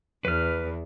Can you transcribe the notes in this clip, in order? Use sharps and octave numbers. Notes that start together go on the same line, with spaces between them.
E2 B4 F6